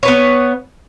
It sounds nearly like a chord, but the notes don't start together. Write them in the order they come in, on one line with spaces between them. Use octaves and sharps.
C#5 B4 B3